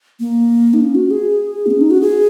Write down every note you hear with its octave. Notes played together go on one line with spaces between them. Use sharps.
A#3
D#4
C#4
F#4
G#4
A#3
C#4
D#4
F#4
G#4